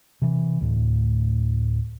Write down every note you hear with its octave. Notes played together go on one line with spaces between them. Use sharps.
C3 E3
D2 A2